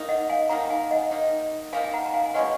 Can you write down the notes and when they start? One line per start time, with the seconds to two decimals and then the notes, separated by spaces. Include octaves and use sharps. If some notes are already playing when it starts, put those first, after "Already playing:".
Already playing: D#3 A#3 D#4
0.09 D#5 F#5
0.30 F5 G#5
0.49 D#3 A#3 D#4 F#5 A#5
0.70 F5 G#5
0.91 D#5 F#5
1.11 D#3 A#3 D#4
1.73 D#3 A#3 D#4 F5 G#5
1.84 G#5
1.93 F#5 A#5
2.06 A#5
2.14 F5 G#5
2.25 G#5
2.34 B2 G#3 C#4 D#5 F#5